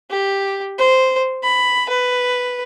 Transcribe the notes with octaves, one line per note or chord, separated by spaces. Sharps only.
G4
C5
B5
B4